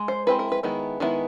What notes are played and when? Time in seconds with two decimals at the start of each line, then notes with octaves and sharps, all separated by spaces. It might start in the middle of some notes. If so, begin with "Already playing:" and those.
Already playing: G#3
0.08 C5
0.27 G#3 C4 E4 B4
0.39 A#4
0.52 B4
0.63 D#3 G#3 B3 E4
1.00 D#3 G#3 B3 E4